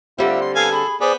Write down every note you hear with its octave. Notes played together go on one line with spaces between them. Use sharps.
D3 G3 C4 F4 E5
C6
B3 A4 F5 G#5
G#4 B5
B3 G#4 C5 D5